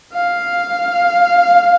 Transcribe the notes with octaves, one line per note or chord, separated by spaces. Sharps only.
F5